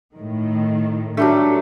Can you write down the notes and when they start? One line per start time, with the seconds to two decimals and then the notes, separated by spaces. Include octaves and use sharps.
0.14 A2 D#3
1.17 F#3 G3 A3 D4